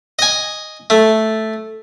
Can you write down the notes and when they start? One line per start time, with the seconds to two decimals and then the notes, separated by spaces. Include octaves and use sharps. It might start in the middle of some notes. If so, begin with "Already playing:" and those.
0.19 D#5 G#5
0.90 A3